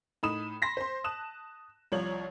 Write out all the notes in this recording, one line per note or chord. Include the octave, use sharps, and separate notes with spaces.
A2 D#4 B5 D#6 E7
B5 C6 A#6 B6
C5 C6
A5 D#6 F#6 E7
C2 F3 C#5 F#7